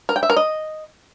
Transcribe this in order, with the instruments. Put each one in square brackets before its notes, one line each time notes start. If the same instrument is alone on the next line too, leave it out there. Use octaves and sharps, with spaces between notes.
[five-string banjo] A#4
G5
E5
A#4
D#5